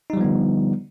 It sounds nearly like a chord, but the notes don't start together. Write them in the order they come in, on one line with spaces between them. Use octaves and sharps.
D#4 G3 F3 B3 D3